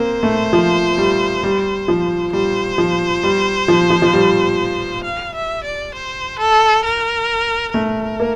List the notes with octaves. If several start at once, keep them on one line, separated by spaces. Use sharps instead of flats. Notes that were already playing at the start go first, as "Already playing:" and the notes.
Already playing: A#3 C4 C5
A3
F3
G3
G3
F3
G3 C5
F3
G3
F3
F3
F3
G3
F5
E5
D5
C5
A4
A#4
A3 A#4
A#3